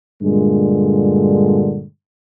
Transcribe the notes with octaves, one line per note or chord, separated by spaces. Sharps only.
G2 A#2 D3 G#3